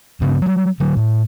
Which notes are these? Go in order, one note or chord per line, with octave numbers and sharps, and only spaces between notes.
G2 C#3 B3
F#3 G3
D3 F#3
A2